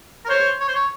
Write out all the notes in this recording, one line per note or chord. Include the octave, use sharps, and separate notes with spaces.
A#4
C5 C#5
C#5
C5
C#5